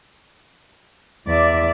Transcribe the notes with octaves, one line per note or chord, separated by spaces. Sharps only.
E2 D5 E5